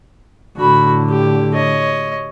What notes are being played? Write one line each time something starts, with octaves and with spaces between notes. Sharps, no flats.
A2 D3 F#4 B5
G4
C#5 D#5